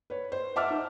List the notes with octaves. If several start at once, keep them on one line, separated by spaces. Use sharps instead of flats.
B4 C#5
C5
E5 F#5 A5 D6 E6 F6
D#4